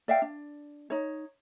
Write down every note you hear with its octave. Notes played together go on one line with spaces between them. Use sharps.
D5 E5 F5 G5
D4
D#4 C#5